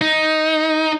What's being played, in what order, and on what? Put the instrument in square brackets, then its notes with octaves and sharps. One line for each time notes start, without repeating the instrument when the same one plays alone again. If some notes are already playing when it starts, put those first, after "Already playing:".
[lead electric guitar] D#4